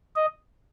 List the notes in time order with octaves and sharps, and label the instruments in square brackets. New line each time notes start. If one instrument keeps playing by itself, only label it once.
[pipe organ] D#5